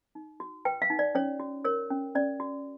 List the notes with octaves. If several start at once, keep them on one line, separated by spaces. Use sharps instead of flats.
D#4
F#4
B4 G5
F5
D#4
D5
C#4 C#5
F#4
A#4 C#5
C#4
C#4 D5
F#4